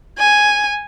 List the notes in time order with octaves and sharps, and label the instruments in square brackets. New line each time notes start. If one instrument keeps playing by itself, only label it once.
[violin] G#5